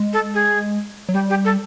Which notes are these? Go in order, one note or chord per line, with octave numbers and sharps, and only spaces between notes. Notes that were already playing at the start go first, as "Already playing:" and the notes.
Already playing: G#3
A4
G#4
F#3
G3 G4
G4
A4